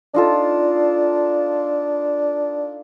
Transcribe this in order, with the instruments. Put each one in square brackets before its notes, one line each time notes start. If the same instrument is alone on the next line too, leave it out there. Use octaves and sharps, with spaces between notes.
[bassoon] D4 [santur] D#4 F4 A4